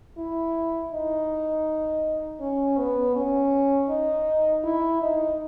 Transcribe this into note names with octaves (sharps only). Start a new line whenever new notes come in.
E4
D#4
C#4
B3
C#4
D#4
E4
D#4